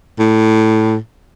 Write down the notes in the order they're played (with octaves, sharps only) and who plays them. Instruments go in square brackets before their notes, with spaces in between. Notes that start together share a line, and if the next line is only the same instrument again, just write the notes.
[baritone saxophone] A2